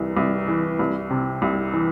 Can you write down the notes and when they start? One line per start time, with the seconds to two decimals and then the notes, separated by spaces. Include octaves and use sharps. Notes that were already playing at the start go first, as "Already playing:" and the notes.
Already playing: C2 E3
0.17 C2
0.48 E3
0.79 C2
1.10 C3
1.42 C2
1.73 E3